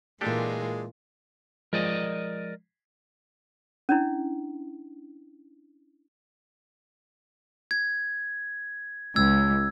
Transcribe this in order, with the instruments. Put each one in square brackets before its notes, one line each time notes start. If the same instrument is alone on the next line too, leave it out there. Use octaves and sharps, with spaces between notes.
[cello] A#2 E3 [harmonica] G#3 [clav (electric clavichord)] D4 G4 A4 [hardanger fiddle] F4 A#4
[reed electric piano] F3 G#3 [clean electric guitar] A#4 D5 D#5
[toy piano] C#4 D4 E4
[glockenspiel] G#6
[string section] C#2 [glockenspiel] E6 G#6